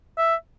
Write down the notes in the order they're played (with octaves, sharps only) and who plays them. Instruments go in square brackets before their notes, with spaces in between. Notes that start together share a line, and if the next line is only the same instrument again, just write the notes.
[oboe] E5